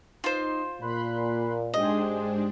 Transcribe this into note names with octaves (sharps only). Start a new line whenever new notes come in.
D#4 F4 C5
A#2 B5 C6 F#6
G#2 G#3 D4 G4 G#4 C5 D#5